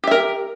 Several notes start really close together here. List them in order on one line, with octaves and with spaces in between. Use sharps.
G4 E5 A#4